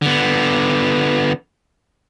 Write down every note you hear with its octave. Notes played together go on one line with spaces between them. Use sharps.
D3 B3